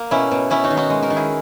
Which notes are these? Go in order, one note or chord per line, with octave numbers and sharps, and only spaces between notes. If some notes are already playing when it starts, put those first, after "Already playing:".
Already playing: A#3
B2 C#4 E4
B2
B3 C#4 E4
D#4 F#4
D#3
D#4 F#4
G#3
F#4 A#4
D#3
E4 G#4